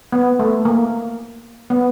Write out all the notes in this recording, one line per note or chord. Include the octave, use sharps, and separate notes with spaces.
B3
A3
A#3
B3